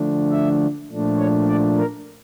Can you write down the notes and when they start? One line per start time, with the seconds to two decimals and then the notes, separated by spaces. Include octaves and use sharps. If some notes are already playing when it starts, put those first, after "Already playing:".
Already playing: D3 F3 A3 D4
0.32 E5
0.90 A#2 F3 A3 D4
1.18 C#5
1.48 D5
1.77 A#4